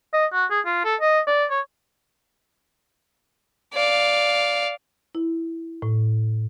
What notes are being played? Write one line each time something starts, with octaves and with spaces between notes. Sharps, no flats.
D#5
F#4
G#4
F4
A4
D#5
D5
C#5
D5 F5
E4
A2